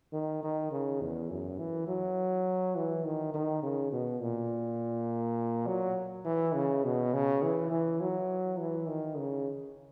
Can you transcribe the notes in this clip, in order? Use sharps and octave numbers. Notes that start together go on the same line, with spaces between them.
D#3
D#3
C#3
E2
F#2
E3
F#3
E3
D#3
D#3
C#3
B2
A#2
F#3
E3
C#3
B2
C#3
E3
E3
F#3
E3
D#3
C#3